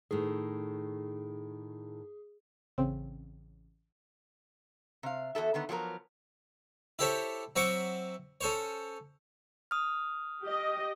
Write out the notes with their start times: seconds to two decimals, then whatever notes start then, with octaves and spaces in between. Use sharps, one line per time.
0.11 A2 D#3 G#4
2.78 A1 C#3 C4
5.03 C3 F5
5.35 E2 F#4 A4 E5
5.54 D3 D#3 B3
5.69 F3 F#3 B3 F#4 A#4
6.99 E4 G4 A4 C5 C#5 E5
7.56 F#3 C4 E5 F#5 C#6 D6
8.41 C#4 A4 C5 C#5
9.71 D#6 F6
10.43 G4 D#5